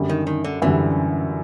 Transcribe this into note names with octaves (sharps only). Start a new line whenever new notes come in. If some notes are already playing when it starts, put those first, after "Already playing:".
Already playing: F#2 D3 G3
D#3
D#3
D3
F#2 D3 E3 G3